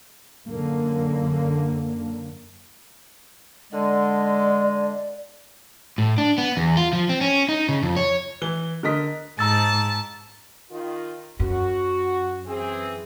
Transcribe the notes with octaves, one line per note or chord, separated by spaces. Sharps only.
F#2 D3 A#3
D3 G#3 D5
A2
D4
B3
E2
F4
F3
C4
C#4
D#4
C#3
F2
C#5
E3 G7
D3 A#4 D#5 B6
G#2 A5 A#5 E6 A6
D#3 F4
F#2 F#4
E3 C4 G#4